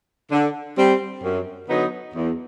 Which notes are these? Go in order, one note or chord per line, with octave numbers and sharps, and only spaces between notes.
D3
G3 C4
F#2
D3 F#3 B3 D#4
E2